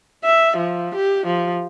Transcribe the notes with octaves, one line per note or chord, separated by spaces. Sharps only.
E5
F3
G4
F3